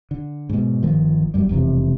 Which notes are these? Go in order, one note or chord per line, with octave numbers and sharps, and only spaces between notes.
D3
G#2 B2
G1 D#3 F3
G1 F#2 G3
E1 F2 C3 E3